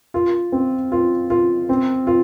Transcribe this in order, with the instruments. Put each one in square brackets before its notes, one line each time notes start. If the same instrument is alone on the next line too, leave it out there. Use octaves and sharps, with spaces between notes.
[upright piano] F4
C4
F4
F4
C4
F4